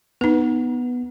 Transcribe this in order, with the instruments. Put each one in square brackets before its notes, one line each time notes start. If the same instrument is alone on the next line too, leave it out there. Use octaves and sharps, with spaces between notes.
[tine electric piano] B3 [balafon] D#4 B4